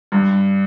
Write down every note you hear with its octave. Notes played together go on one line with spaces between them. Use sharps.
G2